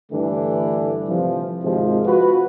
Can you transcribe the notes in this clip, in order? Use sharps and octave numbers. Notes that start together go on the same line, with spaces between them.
G2 D3 E3 A3 D4
C3 E3 F3
G#1 C3 F3 G#3
F4 F#4 B4